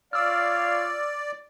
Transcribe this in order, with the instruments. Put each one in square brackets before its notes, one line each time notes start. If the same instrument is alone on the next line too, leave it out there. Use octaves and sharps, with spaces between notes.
[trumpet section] F4 C#5 F5 [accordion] D5 [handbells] E6 F6